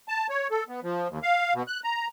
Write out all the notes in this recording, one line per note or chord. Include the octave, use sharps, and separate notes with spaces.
A5
C#5
A4
B3
F3
D#2
F5
B2
F#6
A#5